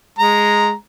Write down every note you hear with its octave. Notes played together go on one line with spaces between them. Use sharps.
G#3 A#5